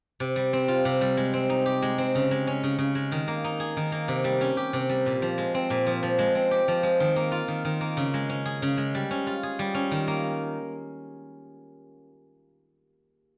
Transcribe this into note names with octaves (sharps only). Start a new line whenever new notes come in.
C3
G3
C4
F4
C3
G3
G#3
C4
D#4
G4
G#3
C4
C#3
G#3
C#4
C#3
C#3
G#3
D#3
A#3
D#4
G#4
D#3
A#3
C3
G3
C#4
G4
C3
G3
A#2
F3
G#3
C4
A#2
F3
F3
G#3
C4
G4
F3
G#3
D#3
A#3
F4
D#3
D#3
A#3
C#3
G#3
C#4
G#4
C#3
G#3
G3
C#4
F4
G#4
G3
C#4
D#3
A#3